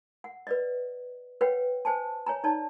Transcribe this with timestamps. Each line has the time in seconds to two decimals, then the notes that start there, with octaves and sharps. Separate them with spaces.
0.24 F#5
0.47 B4 D5 D#5
1.41 B4 C#5 F#5 G5
1.85 C5 G#5 A5
2.26 C#5 G#5 A#5
2.44 D#4 C#5 D5 A5